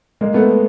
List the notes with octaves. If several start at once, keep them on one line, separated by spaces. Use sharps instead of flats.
G#3 A#3
A3 B3